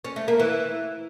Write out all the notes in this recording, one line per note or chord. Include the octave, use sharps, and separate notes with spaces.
C#4
A3
A#3
E3